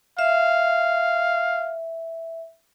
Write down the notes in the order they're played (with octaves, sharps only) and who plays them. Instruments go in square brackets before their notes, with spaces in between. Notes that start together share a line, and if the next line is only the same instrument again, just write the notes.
[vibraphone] E5 [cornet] F5